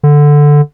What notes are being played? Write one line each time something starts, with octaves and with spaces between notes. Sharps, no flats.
D3